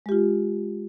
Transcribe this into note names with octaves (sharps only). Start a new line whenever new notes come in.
G#3 F4 G4